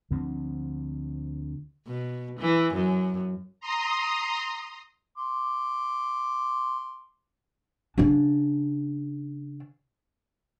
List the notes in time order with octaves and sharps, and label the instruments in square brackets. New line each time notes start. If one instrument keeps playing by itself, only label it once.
[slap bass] D2 D3 F3 C4
[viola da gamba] B2
E3
F#2
[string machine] A#5 C6 D#6
[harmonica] C6 D6
[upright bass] C#3 D4